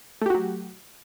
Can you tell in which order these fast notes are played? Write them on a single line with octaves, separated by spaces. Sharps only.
A3 G4 F#4 F#3